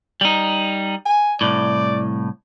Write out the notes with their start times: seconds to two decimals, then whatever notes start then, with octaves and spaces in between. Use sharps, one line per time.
0.21 G3 D#4
1.06 G#5
1.41 C2 A2 D5